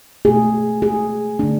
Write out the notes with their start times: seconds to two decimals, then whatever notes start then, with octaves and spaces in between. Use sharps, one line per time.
0.25 B2 A3 G#4
0.82 G#4
1.39 D3 A3 D4